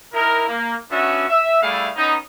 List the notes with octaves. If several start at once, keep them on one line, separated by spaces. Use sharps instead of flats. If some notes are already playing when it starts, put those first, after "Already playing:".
D#4 E4 A#4
A#3
B3 C#4 D4 F#4 E5
E5
G3 A3 E4 G#4 F5
B3 C#4 D#4